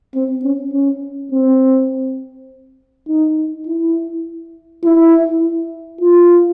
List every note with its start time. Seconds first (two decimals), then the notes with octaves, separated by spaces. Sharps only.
0.15 C4
0.44 C#4
0.73 C#4
1.32 C4
3.08 D#4
3.67 E4
4.85 E4
6.01 F4